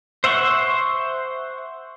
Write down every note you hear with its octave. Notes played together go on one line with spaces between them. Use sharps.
C5 E5 F#5 C6 C#6